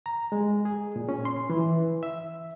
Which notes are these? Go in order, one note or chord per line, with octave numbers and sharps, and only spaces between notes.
A#5
G#3
G#4
A#2
C#4
C6
E3
E5